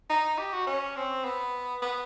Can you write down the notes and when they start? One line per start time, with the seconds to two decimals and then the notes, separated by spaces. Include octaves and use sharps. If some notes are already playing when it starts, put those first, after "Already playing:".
0.10 D#4
0.38 G4
0.53 F#4
0.67 C#4
0.96 C4
1.25 B3
1.82 B3